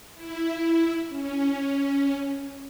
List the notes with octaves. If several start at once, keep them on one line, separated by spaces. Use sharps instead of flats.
E4
C#4